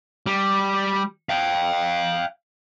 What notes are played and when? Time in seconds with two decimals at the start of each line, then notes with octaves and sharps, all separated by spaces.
0.26 G3
1.29 F5 G5